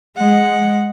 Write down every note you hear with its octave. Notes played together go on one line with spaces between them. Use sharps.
G#3 F#5